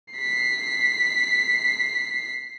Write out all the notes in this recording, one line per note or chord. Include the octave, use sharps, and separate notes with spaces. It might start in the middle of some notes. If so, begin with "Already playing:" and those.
B6 C7